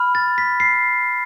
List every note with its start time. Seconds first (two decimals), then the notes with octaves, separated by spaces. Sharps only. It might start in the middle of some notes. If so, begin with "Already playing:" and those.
Already playing: B5 F6
0.15 A6
0.38 B6
0.60 C7